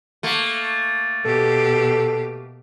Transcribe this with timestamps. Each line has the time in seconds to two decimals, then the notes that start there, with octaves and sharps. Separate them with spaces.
0.23 A3 A#3
1.25 B2 G4 A4